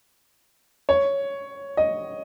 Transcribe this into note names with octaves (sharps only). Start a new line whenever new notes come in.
C#5
D#5